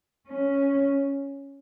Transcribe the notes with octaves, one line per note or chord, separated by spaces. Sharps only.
C#4